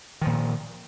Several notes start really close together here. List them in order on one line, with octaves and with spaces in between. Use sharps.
D#3 F3 A#2